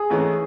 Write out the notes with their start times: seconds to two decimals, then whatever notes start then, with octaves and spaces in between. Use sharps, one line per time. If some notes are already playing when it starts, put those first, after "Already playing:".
Already playing: G#4
0.10 A1 G#2 E3 A3 C#4